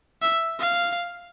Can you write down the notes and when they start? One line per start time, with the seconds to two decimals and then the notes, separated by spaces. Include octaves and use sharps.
0.22 E5
0.60 F5